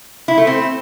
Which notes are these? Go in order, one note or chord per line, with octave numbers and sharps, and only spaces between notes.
E4
A3
C4